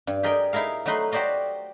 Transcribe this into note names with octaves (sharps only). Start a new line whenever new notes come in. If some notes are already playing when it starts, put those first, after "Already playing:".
G2
G4 G#4 A#4 D5 D#5 G5
D#4 E4 G#4 A#4 F5
F#3 A3 D#4 B4 F#5 C6
F#4 G4 C5 D5 D#5 F5